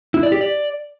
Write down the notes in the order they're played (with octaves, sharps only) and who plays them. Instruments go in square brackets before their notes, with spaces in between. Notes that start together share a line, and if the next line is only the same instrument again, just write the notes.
[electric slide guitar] E4
D5
G4
D5